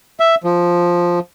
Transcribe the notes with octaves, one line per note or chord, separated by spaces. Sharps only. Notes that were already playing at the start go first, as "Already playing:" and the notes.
E5
F3